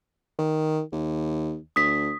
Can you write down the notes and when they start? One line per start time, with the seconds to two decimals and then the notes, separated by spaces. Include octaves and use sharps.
0.39 D#3
0.92 D#2
1.76 D2 D#6 B6